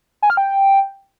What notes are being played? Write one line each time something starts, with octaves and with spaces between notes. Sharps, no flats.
G#5
F6
G5